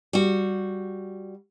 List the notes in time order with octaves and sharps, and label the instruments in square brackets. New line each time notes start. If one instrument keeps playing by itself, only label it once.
[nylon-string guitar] G3 F#4